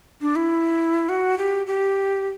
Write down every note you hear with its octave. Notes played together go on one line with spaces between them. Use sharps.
D4
E4
F#4
G4
G4